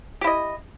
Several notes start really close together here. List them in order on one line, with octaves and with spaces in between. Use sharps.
G4 E4 D#5